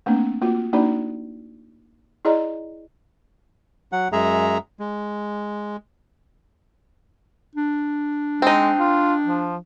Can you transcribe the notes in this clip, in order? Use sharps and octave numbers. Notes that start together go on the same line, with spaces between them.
A3 A#3 C4 D4
A#3 F4 F#4
A#3 D4 D#4 F#4 D5
E4 G#4 D5 D#5 A#5
F#3 F#5
F#2 G#3 G#4 E5 A#5
G#3
D4
G#3 C4 D#4
F4
F3